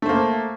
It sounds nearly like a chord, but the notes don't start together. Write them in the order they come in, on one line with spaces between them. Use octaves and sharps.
A3 C5 A#3